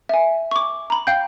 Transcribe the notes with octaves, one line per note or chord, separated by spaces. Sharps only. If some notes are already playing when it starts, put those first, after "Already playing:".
E5 G#5
C#6 D6
A#5 B5
F5 G5 G6